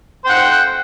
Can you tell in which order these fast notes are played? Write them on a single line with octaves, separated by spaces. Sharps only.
C5 G5 F#5